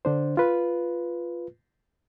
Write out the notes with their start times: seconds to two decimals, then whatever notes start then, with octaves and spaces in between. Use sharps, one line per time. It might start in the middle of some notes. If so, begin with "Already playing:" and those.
0.05 D3 D4 C5
0.37 F4 B4